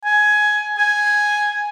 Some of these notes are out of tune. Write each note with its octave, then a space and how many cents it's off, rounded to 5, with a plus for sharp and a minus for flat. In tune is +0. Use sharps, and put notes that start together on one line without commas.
G#5 +15
G#5 +0